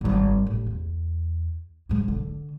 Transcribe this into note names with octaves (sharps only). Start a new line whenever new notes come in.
G#1 G3
A1
E2
G#2 F#3
D3